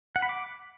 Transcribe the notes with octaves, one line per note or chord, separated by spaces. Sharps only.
F#5
B5
D6